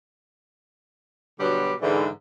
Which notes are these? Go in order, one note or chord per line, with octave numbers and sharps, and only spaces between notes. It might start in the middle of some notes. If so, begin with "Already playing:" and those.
B2 D3 F#3 G3 B3 G4
G#2 D3 E3